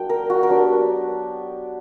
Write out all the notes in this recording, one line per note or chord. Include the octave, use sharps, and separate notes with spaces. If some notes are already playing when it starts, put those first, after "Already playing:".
Already playing: F#3 A#3 D4 G5
A#4
F#4
A#4
F#3 B3 D4 G4